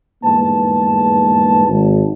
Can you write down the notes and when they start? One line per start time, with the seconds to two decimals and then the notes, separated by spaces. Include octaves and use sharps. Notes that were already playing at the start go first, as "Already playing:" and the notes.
0.23 G1 E2 G#2 A#3 B4 A5
1.68 G#1